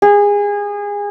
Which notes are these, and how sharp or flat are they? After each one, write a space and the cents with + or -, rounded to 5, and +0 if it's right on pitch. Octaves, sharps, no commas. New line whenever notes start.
G#4 -25